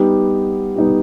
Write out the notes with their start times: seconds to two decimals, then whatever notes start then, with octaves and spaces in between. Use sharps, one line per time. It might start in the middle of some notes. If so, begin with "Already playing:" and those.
Already playing: G3 B3 D#4 G4
0.76 G3 B3 D#4 G4